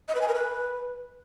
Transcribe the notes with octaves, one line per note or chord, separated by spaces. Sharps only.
D#5
B4
G#5
A#4
B4